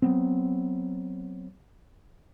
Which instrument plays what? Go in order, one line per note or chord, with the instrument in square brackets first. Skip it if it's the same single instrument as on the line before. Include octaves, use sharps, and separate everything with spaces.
[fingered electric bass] F#3 B3 C4